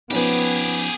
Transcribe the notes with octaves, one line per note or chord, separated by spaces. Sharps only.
F3 B3 C#4 D#4 G4 G#4